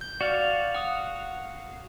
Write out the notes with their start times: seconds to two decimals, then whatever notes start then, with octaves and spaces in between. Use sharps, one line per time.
0.01 G6
0.21 F#4 D5 F5
0.75 F#5 D#6